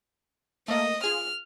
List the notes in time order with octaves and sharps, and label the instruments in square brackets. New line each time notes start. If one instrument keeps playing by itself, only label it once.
[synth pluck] A3 A#3 [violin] D#5
[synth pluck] F4 G#4 [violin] F6